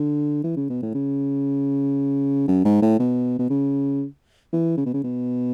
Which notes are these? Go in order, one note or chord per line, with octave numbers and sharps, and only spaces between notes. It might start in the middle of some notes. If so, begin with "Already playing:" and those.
Already playing: D3
E3
C#3
B2
A2
C#3
F#2
G#2
A2
B2
B2
C#3
E3
C#3
B2
C#3
B2